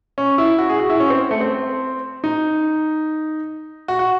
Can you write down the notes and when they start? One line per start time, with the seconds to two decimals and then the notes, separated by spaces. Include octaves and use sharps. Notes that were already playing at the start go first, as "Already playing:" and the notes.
0.18 C#4
0.38 E4
0.58 F#4
0.69 G#4
0.79 F#4
0.90 E4
1.00 C#4
1.10 C4
1.31 A3
1.41 C4
2.24 D#4
3.88 F#4
3.99 F#4